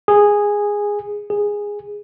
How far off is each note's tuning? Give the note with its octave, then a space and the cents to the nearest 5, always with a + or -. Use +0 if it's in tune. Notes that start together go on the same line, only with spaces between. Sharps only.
G#4 -10
G#4 -10